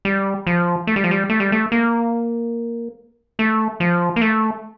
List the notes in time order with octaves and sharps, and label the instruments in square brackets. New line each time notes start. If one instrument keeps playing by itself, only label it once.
[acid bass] G3
F3
A3
G3
F3
G3
A3
G3
A3
A#3
A3
F3
A#3
A3